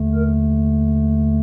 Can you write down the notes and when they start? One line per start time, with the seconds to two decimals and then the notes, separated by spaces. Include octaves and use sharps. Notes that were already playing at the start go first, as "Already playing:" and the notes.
Already playing: D#2 D3 A3
0.15 A#4